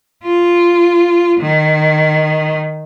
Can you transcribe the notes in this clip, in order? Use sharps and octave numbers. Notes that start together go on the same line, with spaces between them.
F4
D#3